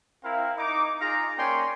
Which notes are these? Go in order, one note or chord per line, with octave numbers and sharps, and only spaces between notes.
C4 E4 A#4 F5
D#4 D6
D#4 F4 G#4 F5 A#5
A#3 C#4 D5 G5 G#5 C6